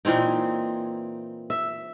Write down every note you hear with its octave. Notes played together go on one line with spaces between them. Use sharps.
A#2 E3 C4 D#4
E5